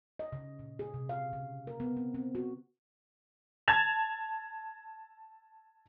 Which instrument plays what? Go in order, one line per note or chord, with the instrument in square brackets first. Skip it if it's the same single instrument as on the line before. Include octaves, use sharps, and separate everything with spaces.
[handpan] D#5
C#3
A#2
G#4
C3
F5
C#3
A#4
B3
C4
C4
F#4
[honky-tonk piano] A5 G#6 A6 E7 F7